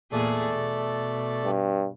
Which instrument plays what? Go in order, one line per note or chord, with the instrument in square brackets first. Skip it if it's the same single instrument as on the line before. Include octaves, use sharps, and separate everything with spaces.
[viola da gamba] E2 A#2 G#4 [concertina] A3 A4 D5
[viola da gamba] B2
[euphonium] G2